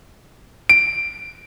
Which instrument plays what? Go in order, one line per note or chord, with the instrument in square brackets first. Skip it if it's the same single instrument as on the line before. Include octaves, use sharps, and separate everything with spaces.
[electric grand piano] D7